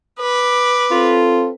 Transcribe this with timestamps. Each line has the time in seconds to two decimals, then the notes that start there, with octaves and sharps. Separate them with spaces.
0.19 B4 D6
0.91 C4 F4 A4